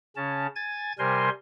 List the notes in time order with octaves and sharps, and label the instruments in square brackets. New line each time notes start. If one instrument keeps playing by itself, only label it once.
[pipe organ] C#3 C#4 A5
G#5 G#6 A6
C3 G3 A#4 C5 G#5 C6